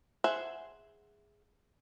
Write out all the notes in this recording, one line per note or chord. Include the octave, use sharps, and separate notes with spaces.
G#4 C5 E5 F#5